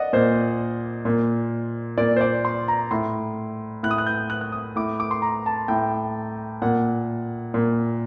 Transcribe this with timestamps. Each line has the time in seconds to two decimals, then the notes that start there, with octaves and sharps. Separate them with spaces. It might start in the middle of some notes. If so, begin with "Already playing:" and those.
Already playing: D5 D#5 F#5
0.13 A#2 C5
1.05 A#2
1.98 A#2 D5
2.16 C5
2.21 D5
2.45 C6
2.68 A#5
2.91 A2 C6
3.83 A2 F#6
3.91 D#6
3.98 F#6
4.06 G6
4.30 F#6
4.41 F#6
4.52 D#6
4.76 A2 D6
5.00 D6
5.11 C6
5.22 A#5
5.46 A5
5.68 A2 G5
6.62 A#2 F#5
7.54 A#2